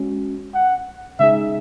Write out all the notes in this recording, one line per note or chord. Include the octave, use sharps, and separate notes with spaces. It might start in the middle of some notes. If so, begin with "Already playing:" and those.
Already playing: G#3 C#4 F#4
F#5
C#3 G#3 D#4 G#4 E5